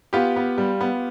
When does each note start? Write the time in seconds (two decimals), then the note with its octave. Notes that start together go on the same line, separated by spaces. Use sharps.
0.13 B3 F4 G4
0.36 B3
0.58 G3
0.81 B3